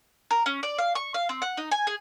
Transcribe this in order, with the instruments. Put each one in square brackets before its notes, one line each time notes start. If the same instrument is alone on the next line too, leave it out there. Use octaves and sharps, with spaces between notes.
[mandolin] A#4
C#4
D5
F5
C#6
F5
C4
F#5
D#4
G#5
G#4